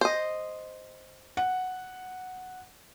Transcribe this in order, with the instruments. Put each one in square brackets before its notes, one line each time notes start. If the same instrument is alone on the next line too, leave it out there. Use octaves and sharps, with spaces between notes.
[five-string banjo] C5 D#5
[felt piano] F#5